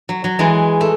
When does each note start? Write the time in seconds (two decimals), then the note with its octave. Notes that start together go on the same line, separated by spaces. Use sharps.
0.09 F#3
0.24 F#3
0.39 E3 G#3
0.81 A3